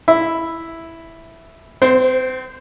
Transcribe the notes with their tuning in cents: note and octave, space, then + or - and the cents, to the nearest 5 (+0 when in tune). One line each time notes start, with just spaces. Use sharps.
E4 +0 E5 +0 B5 +0
C4 -30 C5 +0